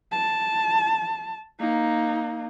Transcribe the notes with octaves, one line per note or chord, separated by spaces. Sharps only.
A5
A#3 D#4